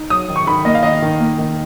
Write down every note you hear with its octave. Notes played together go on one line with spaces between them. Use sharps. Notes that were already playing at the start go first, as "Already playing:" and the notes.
Already playing: D#4
F#3 D#6
D#3
C#6
D#3 B5
A#3 D#5
F5
D#3 D#5
D#3
A#3
D#3